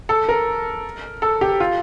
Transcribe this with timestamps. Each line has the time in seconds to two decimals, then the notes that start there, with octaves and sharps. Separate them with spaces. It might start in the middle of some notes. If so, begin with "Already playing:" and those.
0.09 A4
0.29 A#4
1.22 A4
1.41 G4
1.60 F4